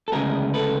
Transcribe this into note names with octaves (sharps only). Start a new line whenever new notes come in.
A4
D2 C#3 E3 G#3 B3 G#4 A#4
A4 B4